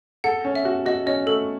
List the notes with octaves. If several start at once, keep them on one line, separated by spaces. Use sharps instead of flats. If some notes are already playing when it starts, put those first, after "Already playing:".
A4 F#5
C#4
E5
F#4
F#4 D#5
C#4 D#5
A3 A4